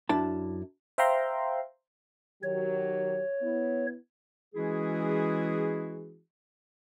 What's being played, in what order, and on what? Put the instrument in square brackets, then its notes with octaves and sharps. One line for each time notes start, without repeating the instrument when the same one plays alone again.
[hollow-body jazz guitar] F#2 D4 E4 A5
[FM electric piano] C5 E5 F5 G5 A#5 C6
[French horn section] D#3 F#3 G4 [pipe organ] C#5
[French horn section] B3 E4
[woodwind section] E3 G#3 C#4 E4 F#4 G#4